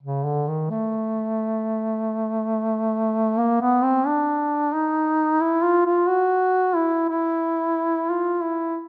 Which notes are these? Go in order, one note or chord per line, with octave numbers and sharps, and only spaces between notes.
C#3
D3
D#3
A3
A#3
B3
C4
D4
D#4
E4
F4
F4
F#4
E4
E4
F4
E4